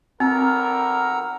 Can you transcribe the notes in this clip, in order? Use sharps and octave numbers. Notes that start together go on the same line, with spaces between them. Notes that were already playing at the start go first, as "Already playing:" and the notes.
B1 F2 C4 A#4 F#5 A#5 E6